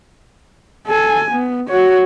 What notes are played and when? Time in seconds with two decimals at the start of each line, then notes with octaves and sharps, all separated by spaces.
0.87 A4 G#5
1.31 B3
1.69 F#4 C#5